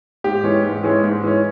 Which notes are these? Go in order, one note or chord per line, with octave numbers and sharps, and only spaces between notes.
G#2 G4
E3 G#3 C#4
G#2
E3 G#3 C#4
G#2
E3 G#3 C#4